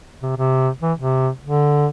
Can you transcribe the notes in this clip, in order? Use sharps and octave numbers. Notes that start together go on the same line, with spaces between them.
C3
C3
E3
C3
D3